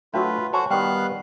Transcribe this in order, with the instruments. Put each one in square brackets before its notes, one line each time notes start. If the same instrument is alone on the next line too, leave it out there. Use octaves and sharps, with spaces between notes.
[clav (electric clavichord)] F#3 A3 [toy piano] D4 F#4 [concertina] F4 B4
[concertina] F#4 C5 [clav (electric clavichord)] A4 C#5 G#5
[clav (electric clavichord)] D#3 G3 [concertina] B3 F5 F#6 [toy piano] G5